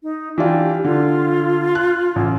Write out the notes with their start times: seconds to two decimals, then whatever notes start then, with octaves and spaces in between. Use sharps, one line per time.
0.03 D#4
0.38 E3 D4 F4 G4
0.84 D3 F4
1.75 F#6
2.16 A1